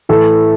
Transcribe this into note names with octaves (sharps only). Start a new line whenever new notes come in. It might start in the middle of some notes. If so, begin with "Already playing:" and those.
A2 E3 A3 A4